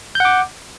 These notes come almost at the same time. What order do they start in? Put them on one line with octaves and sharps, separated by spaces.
G6 F#5 D6